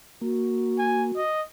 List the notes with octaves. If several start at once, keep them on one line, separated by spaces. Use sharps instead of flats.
A#3 F#4
G#5
D#5